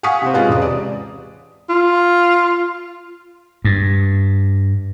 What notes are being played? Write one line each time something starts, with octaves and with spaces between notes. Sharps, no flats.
F5 F#5 G#5 C#6 D#6 B6
C3 C4
G#3 C#4 F4 B4
E1 C3 G#3 D#6
D5
F4
G2